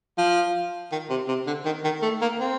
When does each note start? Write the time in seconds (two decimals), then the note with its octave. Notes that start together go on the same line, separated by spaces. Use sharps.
0.18 F3
0.92 D#3
1.10 C3
1.28 C3
1.47 D3
1.65 D#3
1.84 D#3
2.02 A3
2.21 A#3
2.40 C4